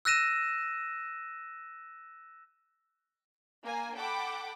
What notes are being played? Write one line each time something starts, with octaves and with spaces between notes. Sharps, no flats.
E6 F#6 A#6 D#7 E7
A#3 G#5
A4 F#5 G5 B5 D6